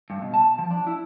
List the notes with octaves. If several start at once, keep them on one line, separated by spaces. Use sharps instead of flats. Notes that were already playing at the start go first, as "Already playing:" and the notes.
G2
B2
A5
F3
D4
E4